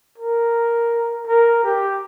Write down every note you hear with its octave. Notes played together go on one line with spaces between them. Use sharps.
A#4
A#4
G4